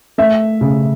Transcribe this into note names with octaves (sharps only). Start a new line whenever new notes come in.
A3 E5
C#3